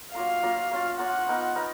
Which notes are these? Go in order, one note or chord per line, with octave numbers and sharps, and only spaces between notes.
F#3 A#3 F4 A#4 F5
F#3 A#3 F4 A#4
A#3 C#4 F4
A#3 C#4 F4 F#5
B3 D#4 A#4 D#5
B3 D#4 A#4 D#5